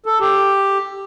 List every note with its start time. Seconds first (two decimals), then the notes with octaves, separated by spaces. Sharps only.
0.06 A4
0.20 G4